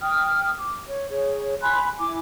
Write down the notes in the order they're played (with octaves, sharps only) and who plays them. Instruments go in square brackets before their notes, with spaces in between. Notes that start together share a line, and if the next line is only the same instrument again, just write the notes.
[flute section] G5 D#6 F6
D6
C#5
G#4 C#5
G#5 B5 C6 F#6
E4 G#5 D6